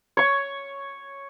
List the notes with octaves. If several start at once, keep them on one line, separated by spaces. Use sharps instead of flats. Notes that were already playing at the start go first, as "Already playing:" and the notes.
C#5 C#6